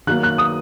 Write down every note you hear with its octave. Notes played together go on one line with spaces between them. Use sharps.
D#3 F#3 A#3 F#6
F#6
D#6